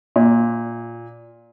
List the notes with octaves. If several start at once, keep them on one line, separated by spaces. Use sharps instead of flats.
A#2